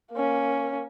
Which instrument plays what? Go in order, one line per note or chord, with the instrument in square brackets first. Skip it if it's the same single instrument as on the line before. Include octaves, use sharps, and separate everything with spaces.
[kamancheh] A#3 C#4